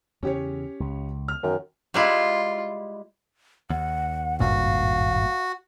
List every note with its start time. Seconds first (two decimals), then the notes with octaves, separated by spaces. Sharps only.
0.23 E2 C#3 C#4 G4 C#5
0.80 C#2
1.28 F6
1.43 F#2 D#3
1.94 G3 G#3 E4 F4
3.70 D#2 F#5
4.40 G#1 G2 A#2 F#4 F5